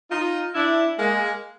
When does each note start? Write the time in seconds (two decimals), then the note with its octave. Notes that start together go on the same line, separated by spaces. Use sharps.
0.10 D#4 F4
0.55 D4 E4
0.98 G#3 A#3